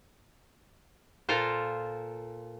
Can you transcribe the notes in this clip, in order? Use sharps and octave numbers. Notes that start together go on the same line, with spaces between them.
A#2 F4 A4 A#4 C5